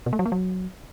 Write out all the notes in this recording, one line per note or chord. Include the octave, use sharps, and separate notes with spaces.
B2
A3
F#3
A#3
F#3